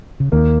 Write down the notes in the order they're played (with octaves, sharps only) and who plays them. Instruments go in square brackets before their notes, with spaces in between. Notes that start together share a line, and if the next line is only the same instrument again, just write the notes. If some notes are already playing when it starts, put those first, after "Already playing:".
[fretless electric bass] C#3
[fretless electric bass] D#2 D#3 [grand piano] A#3